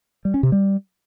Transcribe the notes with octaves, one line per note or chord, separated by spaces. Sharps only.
G3
C#4
C3
G3